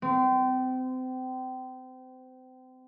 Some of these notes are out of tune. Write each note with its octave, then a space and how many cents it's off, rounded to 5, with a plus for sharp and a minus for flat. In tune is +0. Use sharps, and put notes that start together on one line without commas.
C4 -30